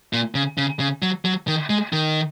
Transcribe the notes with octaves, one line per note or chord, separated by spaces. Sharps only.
A#2
C#3
C#3
C#3
F#3
F#3
D#3
G#3
D#3